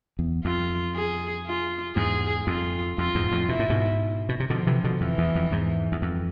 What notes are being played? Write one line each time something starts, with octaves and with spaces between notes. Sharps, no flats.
E2
F2 F4
G#4
F4
E2 G#2 G#4
F2 F4
F2 F4
E2 G#2
F2 A2
B2 E4
A2
G#2 B2
B2
C3
B2 D3 F3
C3 E3
B2 D3
F2 E3
E2
F2
E2 G#2
E2
F2